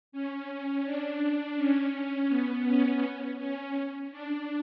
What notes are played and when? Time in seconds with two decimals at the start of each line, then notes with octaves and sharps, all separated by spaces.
0.12 C#4
0.85 D4
1.57 C#4
2.29 B3
2.66 C#4
3.38 C#4
4.11 D4